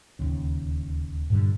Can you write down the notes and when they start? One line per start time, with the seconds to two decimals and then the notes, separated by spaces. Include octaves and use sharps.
0.19 D1 G#1 D#2 C#3
1.30 G2 A#2 D3 G3